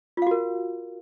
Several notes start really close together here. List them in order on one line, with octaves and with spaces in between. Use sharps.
F4 F5 F#4 A#4